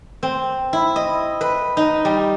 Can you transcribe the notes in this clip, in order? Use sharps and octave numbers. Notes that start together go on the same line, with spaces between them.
C4
E4
D#5
B4
D#4
G3